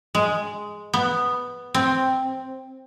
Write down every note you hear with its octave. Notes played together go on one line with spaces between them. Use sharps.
G#3
B3
C4